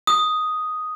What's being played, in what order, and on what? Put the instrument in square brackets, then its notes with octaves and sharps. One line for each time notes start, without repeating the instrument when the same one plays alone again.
[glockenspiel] D#6